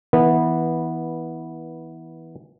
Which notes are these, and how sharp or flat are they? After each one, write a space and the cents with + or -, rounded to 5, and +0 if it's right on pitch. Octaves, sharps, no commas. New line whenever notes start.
E3 -20 B3 -10